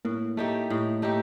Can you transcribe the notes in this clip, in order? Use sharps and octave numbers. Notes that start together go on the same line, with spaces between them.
A2 A#3
A3 D#4 G4
A2
A3 D#4 G4